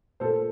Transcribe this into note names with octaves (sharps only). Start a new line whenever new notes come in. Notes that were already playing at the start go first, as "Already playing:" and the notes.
A#2 A4 C5